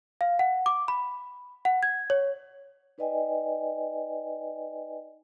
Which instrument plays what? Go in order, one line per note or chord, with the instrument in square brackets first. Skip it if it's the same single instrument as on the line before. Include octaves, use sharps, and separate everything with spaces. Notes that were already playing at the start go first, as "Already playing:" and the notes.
[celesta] F5
F#5
D6
B5
F#5
G#6
C#5
[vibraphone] D#4 B4 D5 D#5 G5 G#5